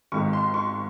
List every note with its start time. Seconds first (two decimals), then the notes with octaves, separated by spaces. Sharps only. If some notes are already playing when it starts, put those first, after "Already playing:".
0.12 G#1 G#2 D#3 C#6
0.33 C6
0.54 C#6